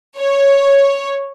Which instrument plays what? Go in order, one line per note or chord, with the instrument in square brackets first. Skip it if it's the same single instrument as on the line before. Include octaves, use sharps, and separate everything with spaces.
[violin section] C#5